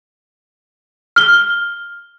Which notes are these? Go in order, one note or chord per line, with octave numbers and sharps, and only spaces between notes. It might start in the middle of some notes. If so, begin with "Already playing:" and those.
F6 G7